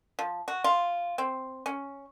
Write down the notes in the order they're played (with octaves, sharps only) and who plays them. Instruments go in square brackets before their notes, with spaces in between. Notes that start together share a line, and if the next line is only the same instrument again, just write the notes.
[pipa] F3
F#4
F4
C4
C#4